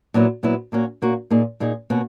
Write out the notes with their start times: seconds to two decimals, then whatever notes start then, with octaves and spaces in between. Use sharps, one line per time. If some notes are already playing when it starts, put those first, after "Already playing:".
0.14 A#2 F#3 B3 E4
0.43 A#2 F#3 B3 E4
0.72 A#2 A#3 C#4 F#4
1.02 A#2 A#3 C#4 F#4
1.30 A#2 A#3 D#4 G#4
1.60 A#2 A#3 D#4 G#4
1.90 B2 A#3 C#4 F#4